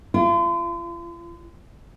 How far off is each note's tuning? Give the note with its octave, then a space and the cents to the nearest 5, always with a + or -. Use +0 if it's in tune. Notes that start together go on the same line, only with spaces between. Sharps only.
F4 -40